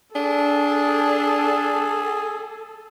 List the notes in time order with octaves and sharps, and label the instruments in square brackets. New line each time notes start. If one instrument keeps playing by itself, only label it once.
[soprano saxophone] D4 [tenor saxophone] G#4 [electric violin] A4